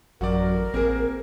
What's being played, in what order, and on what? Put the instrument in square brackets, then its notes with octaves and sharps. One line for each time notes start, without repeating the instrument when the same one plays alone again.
[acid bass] A1 [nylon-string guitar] F#2 F#3 [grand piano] F#4 D5 [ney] A#4
[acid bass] A1 [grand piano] A#3 [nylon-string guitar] C4 G#4